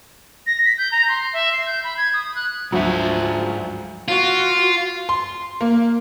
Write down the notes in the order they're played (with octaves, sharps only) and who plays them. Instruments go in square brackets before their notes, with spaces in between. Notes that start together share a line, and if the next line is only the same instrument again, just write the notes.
[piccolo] A#6
B6
G6
A#5
C6
E5
C7
G6
B5
G#6
D#6
F#6
[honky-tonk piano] D2 F#3 [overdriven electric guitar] G#2 E5 [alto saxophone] F3
[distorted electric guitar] F4 [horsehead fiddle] F#4
[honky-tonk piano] C6
A#3